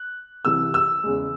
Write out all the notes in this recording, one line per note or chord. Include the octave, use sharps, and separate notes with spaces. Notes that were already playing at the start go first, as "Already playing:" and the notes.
Already playing: F#6
C2 C3 E3 E6
E6
E2 C#3 G#3